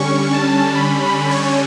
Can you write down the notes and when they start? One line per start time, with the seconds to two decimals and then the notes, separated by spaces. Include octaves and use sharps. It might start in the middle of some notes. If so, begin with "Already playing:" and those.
Already playing: D3 G3 C#4 C#6
0.33 A5
0.75 B5
1.03 B5
1.31 C#5